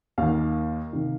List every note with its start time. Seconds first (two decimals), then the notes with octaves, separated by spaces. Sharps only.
0.18 D#2 D#3 F5
0.93 C3 D#3